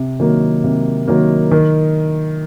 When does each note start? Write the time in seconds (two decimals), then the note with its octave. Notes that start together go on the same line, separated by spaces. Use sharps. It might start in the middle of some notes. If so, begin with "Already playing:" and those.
Already playing: C3
0.20 D#3 F#3 A#3
0.64 C3
1.08 D#3 F#3 A#3
1.51 D#3